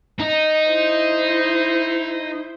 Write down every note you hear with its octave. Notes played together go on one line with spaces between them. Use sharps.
D#4
E4 C5